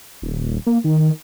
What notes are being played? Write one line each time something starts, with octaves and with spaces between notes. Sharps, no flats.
D#1
A#3
D#3